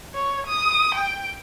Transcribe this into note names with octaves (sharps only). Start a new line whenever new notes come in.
C#5
D#6
G5